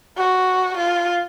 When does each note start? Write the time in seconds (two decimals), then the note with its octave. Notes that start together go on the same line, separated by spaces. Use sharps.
0.17 F#4
0.77 F4